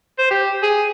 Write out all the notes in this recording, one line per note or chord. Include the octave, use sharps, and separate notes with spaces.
C5
G4
G#4